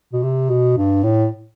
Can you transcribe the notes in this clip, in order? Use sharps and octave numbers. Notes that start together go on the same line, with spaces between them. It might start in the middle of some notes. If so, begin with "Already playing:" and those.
B2
C3
B2
G2
A2